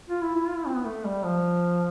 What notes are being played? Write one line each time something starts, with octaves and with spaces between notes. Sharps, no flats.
F4
E4
E4
F4
E4
C4
B3
A3
G3
F3